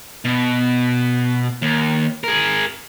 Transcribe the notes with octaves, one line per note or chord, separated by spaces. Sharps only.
B2
D#2
G#4 A#4